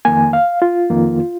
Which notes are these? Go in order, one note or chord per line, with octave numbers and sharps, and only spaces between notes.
F2 D#3 A#3 G#5
F5
F4
F2 D#3 A#3